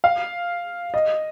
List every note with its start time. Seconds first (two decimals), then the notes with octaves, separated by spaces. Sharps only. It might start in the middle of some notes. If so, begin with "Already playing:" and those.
0.04 F5
0.94 D#5